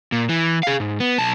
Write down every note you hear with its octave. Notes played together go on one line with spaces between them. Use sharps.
A#2
E3
G#4 F5
G#2
B3
B1 A5